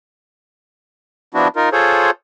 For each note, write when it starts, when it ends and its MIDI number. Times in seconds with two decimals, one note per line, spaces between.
1.34 1.48 53
1.34 1.48 59
1.34 1.48 62
1.34 1.48 64
1.34 1.48 66
1.56 1.69 63
1.56 1.69 65
1.56 1.69 70
1.72 2.11 65
1.72 2.11 68
1.72 2.11 69
1.72 2.11 72
1.72 2.11 73